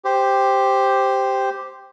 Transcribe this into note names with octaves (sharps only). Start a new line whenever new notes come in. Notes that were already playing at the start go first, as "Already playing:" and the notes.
G4 C5